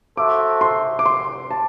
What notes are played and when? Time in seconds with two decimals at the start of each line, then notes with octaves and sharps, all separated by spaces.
0.17 F#4 A4 C5 E5 D6
0.61 C6
0.99 D6
1.06 C6
1.51 A5